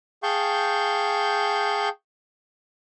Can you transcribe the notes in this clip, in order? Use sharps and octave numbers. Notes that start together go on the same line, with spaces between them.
G#4 F5 G5 A5 C#6 G6